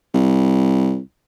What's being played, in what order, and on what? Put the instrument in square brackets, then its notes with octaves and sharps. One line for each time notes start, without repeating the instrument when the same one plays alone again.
[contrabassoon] C2